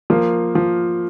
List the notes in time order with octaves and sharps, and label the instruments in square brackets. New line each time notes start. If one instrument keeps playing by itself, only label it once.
[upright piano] F3 [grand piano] A#3
[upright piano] F3